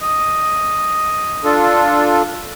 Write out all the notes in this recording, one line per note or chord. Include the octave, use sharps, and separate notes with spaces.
D#5
D4 F4 A4